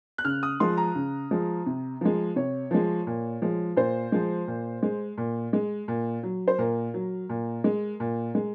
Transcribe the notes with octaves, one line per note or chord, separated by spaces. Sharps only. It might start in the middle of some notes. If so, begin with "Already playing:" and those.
F#6
C#3 F6
D#6
F3 G#3 C6
A#5
C#3
F3 G#3
C3
F3 G#3
C3 C#5
F3 G#3
A#2
F3 G#3
A#2 C5
F3 G#3
A#2
G#3
A#2
G#3
A#2
F#3
C5
A#2 A#4
F#3
A#2
G#3
A#2
G#3